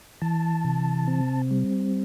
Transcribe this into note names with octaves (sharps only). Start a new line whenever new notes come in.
E3 A5
C3
C4
G3